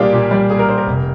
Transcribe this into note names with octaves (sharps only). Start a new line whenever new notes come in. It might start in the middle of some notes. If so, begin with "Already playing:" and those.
Already playing: A#2 G3 A#3 D4 F4 G4 G#4
A#2
G3
A#3 G#4
A#4
D4 C5
A#4
F1